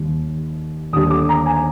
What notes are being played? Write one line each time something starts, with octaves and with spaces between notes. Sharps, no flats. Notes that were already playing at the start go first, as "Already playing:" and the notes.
Already playing: D#2 D#3 G3
D#2 D3 G3 D#6
D6
A#5
G#5